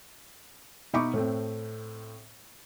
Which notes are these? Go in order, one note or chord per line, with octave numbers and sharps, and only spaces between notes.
B2 D#4 E5 B5 C#6 D6
A2 A3 C4